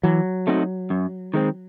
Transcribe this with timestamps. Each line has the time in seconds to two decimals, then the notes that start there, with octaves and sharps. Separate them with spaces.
0.03 E3 F#3
0.47 A3 C4 D#4 F#4
0.90 F#2
1.34 D#3 G#3 C4